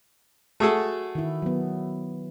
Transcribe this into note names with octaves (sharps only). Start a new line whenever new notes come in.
A3 F#4 G#4 A4
D#3 E4
F#3 B3